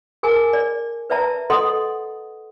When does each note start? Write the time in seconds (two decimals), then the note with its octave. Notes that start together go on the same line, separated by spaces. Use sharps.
0.23 G#4 A#4 G#5 A5
0.53 D5
1.10 B4 D5 E5 A5 A#5
1.50 A4 D#5 F#5 C6 D#6